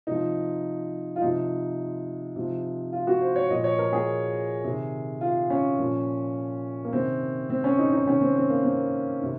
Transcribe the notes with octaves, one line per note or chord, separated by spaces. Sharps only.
C3 F3 D#4
F4
C3 F3 D#4
C3 F3
F4
F#4
C5
C#5
A#2 F3 D#5
C#5
A#4
G#4
C3 D#3
F4
C#4
A#2 F3
A#3
C3 D#3 C4
C4
C#4
D#4
D#4
C3 D#3 C#4
C4
C4
A#3
C4
C3 D#3